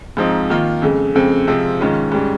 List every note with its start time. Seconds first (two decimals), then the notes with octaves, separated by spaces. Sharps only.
0.17 G#2 F3 C4 D#4
0.50 D#3 A#3 F4
0.82 F2 C#3 G#3
1.15 F2 C#3 G#3 C4
1.47 C3 F3 G#3 C4
1.80 G#2 D#3 G#3 C#4 F4
2.12 G#2 G3 C#4